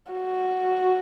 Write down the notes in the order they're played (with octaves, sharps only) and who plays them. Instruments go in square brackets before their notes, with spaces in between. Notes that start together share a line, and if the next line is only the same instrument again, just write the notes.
[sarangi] F#4